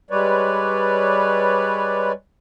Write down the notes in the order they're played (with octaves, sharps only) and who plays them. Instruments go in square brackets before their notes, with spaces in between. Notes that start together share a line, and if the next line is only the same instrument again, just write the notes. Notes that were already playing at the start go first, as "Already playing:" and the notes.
[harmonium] G3 G#3 B4 C#5 D5